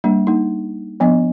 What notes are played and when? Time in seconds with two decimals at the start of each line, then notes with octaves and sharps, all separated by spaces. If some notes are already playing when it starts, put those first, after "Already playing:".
0.04 G3 A#3 D4
0.27 A#3 D#4
1.00 F3 B3 D4 D#5